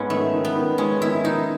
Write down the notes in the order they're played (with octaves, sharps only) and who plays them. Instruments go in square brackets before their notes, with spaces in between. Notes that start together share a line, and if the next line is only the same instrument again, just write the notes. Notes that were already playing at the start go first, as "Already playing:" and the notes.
Already playing: [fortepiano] G#2 [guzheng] B3 C#4
[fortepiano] D#3 [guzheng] A3
[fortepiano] D#3
[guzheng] B3
[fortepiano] D#3
[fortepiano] G#3 [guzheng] C#4
[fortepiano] D#3 [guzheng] E4
[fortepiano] D#3 [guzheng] D#4